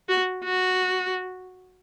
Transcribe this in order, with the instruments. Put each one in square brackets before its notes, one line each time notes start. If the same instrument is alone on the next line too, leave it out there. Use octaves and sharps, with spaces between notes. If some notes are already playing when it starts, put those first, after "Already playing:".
[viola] F#4
F#4